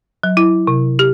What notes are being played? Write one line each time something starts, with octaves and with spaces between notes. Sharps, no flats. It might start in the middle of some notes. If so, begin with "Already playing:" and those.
F#3
E4
C3
G4